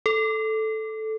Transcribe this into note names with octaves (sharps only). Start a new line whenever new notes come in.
A4